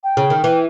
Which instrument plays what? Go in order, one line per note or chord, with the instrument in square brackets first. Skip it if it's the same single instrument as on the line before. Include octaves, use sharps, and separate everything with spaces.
[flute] G5
[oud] C#3
D#3
E3